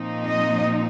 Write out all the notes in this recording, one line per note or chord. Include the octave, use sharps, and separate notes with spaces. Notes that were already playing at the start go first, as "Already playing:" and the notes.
Already playing: A#2 F3 C4 D#4
D#5